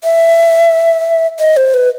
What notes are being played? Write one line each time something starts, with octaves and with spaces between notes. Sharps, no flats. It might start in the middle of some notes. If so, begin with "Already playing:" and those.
E5
D#5
C5
B4